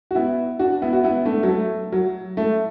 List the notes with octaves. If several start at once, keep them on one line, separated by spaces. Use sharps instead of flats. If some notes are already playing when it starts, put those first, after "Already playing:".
F#4
B3 E4
D4 F#4
B3 E4
F#4
B3 E4
A3 D4
F#3
A3
F#3
A3